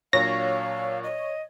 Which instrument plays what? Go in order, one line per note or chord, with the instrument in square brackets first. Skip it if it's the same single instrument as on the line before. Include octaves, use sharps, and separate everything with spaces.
[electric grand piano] A#2 F#3 D4 [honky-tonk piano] C#5 [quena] F5 [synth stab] A#6
[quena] D#5